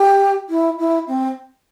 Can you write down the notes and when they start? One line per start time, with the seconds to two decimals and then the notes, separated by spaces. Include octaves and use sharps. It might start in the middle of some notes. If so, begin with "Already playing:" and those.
Already playing: G4
0.50 E4
0.78 E4
1.08 C4